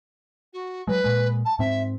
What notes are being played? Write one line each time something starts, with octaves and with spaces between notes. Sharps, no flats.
F#4
F#3 G#3 B4
A#2 G#3
A5
G#2 C4 E5